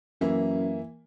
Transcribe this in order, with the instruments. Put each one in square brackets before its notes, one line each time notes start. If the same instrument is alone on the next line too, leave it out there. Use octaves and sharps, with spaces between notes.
[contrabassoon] F#2 [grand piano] E3 A#3 E4